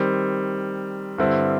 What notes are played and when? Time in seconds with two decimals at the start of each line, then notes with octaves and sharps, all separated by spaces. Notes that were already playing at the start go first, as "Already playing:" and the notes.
Already playing: D#3 G3 C4
1.18 G2 D3 G3 C4 E4